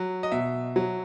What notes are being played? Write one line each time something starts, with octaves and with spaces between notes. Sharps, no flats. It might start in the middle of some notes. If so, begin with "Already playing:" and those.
Already playing: F#3
D#5
B2 E5
F#3